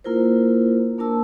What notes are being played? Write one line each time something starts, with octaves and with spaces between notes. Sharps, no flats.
A#3 E4 F4 A#4 C5
A#3 D4 A#4 A5 E6